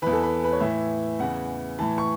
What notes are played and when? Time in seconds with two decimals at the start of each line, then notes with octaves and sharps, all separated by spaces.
0.02 E2 E3 B4
0.13 A4
0.22 B4
0.44 B4
0.53 C#5
0.60 A2 E3 E5
1.19 E2 C#3 E3 F#5
1.79 A2 E3 A5
1.98 C#6